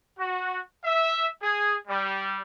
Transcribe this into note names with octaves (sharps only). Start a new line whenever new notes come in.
F#4
E5
G#4
G3